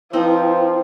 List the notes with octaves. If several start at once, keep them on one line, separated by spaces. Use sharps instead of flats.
F3 C4 D#4 E4 B4 C5 G5